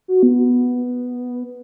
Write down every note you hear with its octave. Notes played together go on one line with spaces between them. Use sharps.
F#4
B3